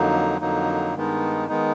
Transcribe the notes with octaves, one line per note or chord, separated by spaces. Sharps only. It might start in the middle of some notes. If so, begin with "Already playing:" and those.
Already playing: F2 D3 F#3 A#3 D#4
F2 D3 F#3 A#3 D#4
G2 D#3 G#3 B3 D#4
D#3 G#3 B3 D#4